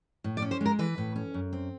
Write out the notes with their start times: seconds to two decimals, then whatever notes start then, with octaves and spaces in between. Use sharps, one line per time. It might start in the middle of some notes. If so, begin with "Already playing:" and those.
0.24 A2
0.37 D5
0.42 C#4
0.51 C5
0.61 G#3
0.66 A#4
0.79 E3 B4
0.98 A2
1.15 C#4
1.34 F#2
1.53 C4